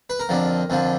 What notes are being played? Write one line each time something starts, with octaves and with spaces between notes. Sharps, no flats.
B4
A#4
F2 D3 F3
F2 D3 F3